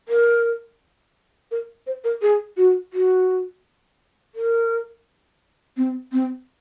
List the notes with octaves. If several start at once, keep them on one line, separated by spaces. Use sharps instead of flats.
A#4
A#4
C5
A#4
G#4
F#4
F#4
A#4
C4
C4